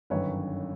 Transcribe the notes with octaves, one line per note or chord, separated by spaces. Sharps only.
G1 F#2 D#3 B4 C#5